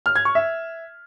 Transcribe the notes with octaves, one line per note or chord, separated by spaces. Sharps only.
F6
G#6
C#6
E5